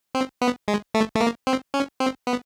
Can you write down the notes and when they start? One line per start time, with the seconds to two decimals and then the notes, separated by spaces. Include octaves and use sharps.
0.15 C4
0.42 B3
0.68 G#3
0.94 A3
1.16 A3
1.21 A#3
1.47 C4
1.74 C#4
2.00 C4
2.27 B3